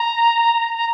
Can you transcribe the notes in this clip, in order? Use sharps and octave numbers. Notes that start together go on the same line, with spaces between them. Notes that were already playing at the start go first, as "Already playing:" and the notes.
Already playing: A#5
A#5